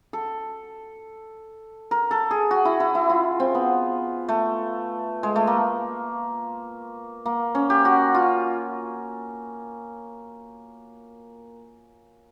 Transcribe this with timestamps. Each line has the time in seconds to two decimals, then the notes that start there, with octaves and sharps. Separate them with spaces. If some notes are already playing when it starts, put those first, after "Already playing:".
0.13 A4
1.91 A#4
2.11 A4
2.31 G#4
2.51 F#4
2.65 E4
2.80 E4
2.95 E4
3.10 F4
3.40 C4
3.55 B3
4.29 A3
5.23 G#3
5.36 A3
5.47 A#3
7.26 A#3
7.55 C#4
7.70 G4
7.85 F#4
8.15 F4